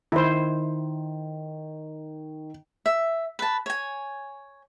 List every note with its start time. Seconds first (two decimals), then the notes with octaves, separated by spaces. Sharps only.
0.12 D#3 E4 C5
2.86 E5
3.39 B4 A5
3.66 C#5 G#5